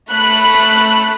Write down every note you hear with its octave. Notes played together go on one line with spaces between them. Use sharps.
A3 B5 F#6